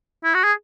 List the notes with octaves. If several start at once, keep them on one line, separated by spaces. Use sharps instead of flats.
E4
F#4
G#4